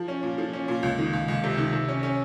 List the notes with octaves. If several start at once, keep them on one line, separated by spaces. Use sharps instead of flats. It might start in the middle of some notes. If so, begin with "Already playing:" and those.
Already playing: F3
C#4
A#2
F3
C#4
A#2
C#2
D#3
C#2
C#2
C3
D#3
C3
C#4
C#4